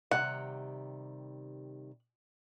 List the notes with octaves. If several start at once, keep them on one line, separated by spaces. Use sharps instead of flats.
C3 D#3 G3 F#5